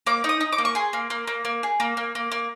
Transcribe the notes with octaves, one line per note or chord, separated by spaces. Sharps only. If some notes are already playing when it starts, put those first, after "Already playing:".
A#3 D6
D#4
D#6
D#4
D6
A#3
C#6
G#4 C6
A#3
A#3
A#3
A#3
G#4
A#3
A#3
A#3
A#3